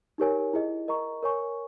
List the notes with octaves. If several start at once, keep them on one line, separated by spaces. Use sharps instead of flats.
D#4 G4 A#4 C#5 G#5
E4 G#4 D#5
A#4 D#5 A#5 C#6
A#4 C#5 G#5 C#6